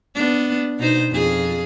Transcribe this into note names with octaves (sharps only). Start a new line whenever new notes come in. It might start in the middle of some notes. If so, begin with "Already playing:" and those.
B3 D4
B2 D#4 C5
F2 F4 G#4